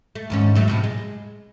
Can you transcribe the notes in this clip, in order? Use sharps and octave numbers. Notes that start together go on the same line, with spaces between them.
A3
D#2 G#2 C#4
E2 F#3 A3
A2 C3 F3
G#3